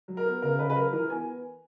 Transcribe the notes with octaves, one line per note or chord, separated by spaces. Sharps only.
F#3
A#4
B3
C#3 A#4
C#3 B4
B4
F#3 A#4
E3 A#4
B3 G#5